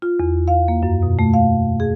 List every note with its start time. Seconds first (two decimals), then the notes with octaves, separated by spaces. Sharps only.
0.02 F4
0.20 E2
0.48 F5
0.68 A#3
0.83 F#2
1.03 B2
1.19 A3
1.34 F5
1.80 G#4